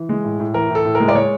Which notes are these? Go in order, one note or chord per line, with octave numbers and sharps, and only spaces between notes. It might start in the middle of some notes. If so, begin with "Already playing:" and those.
Already playing: E3
G#3
A2
A2
E3 A#4
A2
A4
A2
A#4
G#3
D5
G#3 C#5